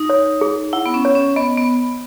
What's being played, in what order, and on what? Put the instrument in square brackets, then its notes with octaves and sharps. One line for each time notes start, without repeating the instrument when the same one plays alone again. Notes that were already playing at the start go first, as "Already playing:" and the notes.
Already playing: [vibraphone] D#4
[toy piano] C#5
G#4
[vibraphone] E4 [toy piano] F#5
[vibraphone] B3
C#4
[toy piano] C#5
[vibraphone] C#4
[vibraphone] B3 [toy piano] D#5
[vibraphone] B3